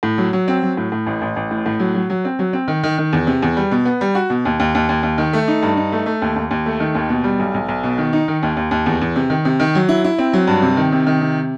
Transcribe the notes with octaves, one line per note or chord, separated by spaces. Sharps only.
A2
F#3
F#3
C4
F#3
A2
A2
A1
A1
A1
A2
A2
F#3
F#3
F#3
C4
F#3
C4
D#3
D#3
D#3
E2
C3
E2
G3
B2
B3
G3
F#4
B2
D#2
D#2
D#2
D#2
D#2
D#3
A3
D#4
G2
D#4
A3
A3
D#2
D#2
D#2
A3
D#3
D#2
B2
G3
B1
B1
B1
B2
D#3
D#4
D#3
D#2
D#2
D#2
E2
E2
C3
D#3
C3
D#3
F#3
E4
E4
C4
F#3
G2
C3
D#3
C3
D#3
C3